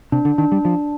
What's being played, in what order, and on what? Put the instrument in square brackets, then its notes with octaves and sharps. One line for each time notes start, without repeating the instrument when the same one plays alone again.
[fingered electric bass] C3 [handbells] D4
[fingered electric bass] D3
[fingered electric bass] D#3 [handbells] D4
[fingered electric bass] G3
[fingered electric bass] F3 [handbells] D4